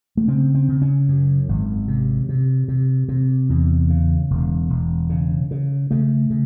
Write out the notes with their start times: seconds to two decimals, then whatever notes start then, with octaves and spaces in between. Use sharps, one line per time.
0.17 A3
0.28 C#3 C4
0.55 C4
0.68 C#3
0.82 C#4
1.08 F#2
1.49 G#1
1.88 C3
2.29 C3
2.68 C3
3.08 C3
3.49 E2
3.90 C#3
4.30 E1
4.70 E1
5.10 C#3
5.51 C#3
5.91 C#3 A3
6.30 C#3